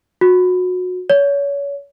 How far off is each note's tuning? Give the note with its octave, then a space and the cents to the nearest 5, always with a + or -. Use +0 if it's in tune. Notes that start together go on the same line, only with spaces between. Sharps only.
F#4 -25
C#5 +30